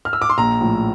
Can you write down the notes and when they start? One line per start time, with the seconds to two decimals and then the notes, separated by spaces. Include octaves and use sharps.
0.05 F6
0.13 E6
0.22 D6
0.30 C6
0.38 A#1 A#5
0.60 A2 F3